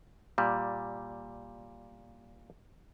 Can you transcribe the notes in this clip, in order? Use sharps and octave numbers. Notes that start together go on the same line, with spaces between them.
A#2 G3